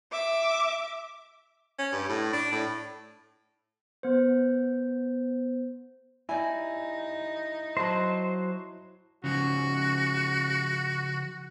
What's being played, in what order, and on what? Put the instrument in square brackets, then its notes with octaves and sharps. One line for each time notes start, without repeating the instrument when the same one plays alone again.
[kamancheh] E5 D6
[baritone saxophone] C#4
G2
A2
D4
A2
[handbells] B3 C5
[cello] D#4 [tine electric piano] E4 [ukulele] G4 D5 G#5
[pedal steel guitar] F#3 C5 [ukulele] D#5 A5 B5
[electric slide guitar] C#3 F3 [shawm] F#4